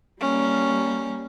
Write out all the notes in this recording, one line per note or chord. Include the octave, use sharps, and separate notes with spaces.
G3 A#3 C#4